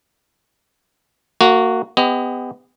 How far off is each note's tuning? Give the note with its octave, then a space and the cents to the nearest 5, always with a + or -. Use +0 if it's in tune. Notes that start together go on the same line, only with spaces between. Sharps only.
A#3 -25 F#4 +0
B3 +30 G4 +35 D#5 +0